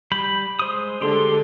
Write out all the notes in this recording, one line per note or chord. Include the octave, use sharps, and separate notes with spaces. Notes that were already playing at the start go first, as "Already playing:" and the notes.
G3 B5 G6
G#3 C5 D#6
D3 G#3 G4 A4 C6